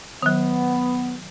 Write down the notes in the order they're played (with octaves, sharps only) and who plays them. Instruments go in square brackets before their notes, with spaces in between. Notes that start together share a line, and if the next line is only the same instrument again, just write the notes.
[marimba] D#3 F#3 [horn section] B3